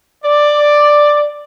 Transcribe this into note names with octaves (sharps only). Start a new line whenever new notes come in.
D5